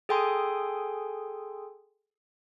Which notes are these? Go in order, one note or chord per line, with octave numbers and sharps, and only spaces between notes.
G#4 A4 G5 G#5 C6 D#6